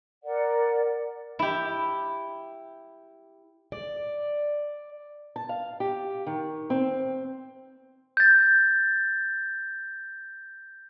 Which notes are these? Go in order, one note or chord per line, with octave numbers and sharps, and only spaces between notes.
A#4 D5 F#5
E4 G4
D5
A5
F5
G4
D#3
C4
G6 A6